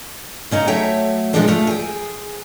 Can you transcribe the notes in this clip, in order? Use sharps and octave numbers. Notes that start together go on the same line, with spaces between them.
C#3 C#4 D#4
F#3 A3 C#5 E5 G5
A#2 D3 F3 G#3 D4 A4
F3 A3 F4
G#4 G5